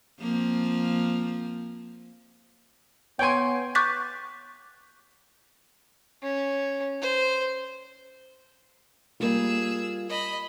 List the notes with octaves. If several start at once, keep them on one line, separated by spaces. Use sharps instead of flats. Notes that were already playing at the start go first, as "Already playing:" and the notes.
F3 A#3 C4
B3 C#5 G5 G#5 C6
C#6 D6 F#6 G6 A6 B6
C#4
C5
G3 A#3 F4 G#4 E6
D#5 B5